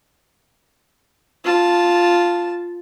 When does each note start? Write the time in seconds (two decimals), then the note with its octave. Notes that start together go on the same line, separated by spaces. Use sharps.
1.44 F4 A5